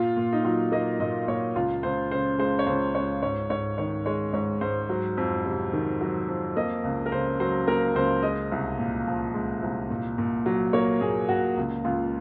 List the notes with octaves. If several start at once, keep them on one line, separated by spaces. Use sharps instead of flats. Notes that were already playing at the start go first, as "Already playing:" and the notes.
Already playing: A#2 F4
A#2
D#4
F#3 F4
A#3 D#5
A#2 D#5
A#2 C#5
C#2 F4
C#2 C5
C#3 C5
G#3 C5
C#5
C#2 C5
C#2 C#5
G#2 C#5
G#2 C#5
D#3 C#5
G#3 C#5
G#2 C#5
G#2 C5
F#3
F2
C3
D#3
F#3
F2
A#3 D#5
C#2
A#4
C#3 C5
F#3 C5
A#3 A#4
C#2 C5
G#3 D#5
C2
A#2
F3
G#3
C2
A#2
A#2
F#3
A#3 C#5
A#2 G#4
A#2 F#4
C#2
C#2 F4